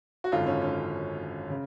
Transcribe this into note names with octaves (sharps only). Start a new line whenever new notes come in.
F#4
G#1 F#2 D3 F4
C#4
C#4
C#3